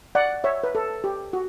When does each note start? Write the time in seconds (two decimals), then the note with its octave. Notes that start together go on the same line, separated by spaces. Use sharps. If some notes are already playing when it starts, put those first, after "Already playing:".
0.15 D5 F#5
0.44 C#5 E5
0.64 B4
0.75 A4
1.04 G4
1.33 F#4